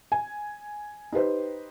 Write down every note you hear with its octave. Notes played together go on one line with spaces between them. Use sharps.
G#5
D#4 G4 B4 C5